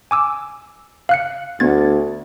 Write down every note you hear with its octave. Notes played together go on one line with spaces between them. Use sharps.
G#5 D6 E6
F5 F#6 C#7
D2 B3 G#6 A6